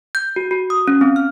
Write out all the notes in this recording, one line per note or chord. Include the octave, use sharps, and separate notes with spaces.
G6
F#4
F#4
D#6
C#4
C4
F6